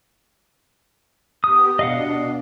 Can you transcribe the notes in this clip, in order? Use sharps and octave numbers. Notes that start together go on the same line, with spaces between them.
B3 G4 D#6
B2 D4 D#5 F5 F#5